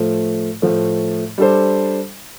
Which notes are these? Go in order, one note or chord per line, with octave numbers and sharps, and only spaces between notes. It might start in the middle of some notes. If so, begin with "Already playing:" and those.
Already playing: A2 F3 A3
A2 F3 A3
G3 D4 A4 C5